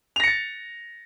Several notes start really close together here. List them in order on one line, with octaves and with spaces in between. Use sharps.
F7 A#6 C#7 A6